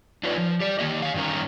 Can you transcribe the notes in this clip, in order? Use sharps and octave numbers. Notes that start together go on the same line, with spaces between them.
D4 D#4 F4 B4 C#5 D5
F3
G4 D5
D#3 E3 A#3 G4 D#5
C#5 F5
G2 D#3 F#3 C#4 A#4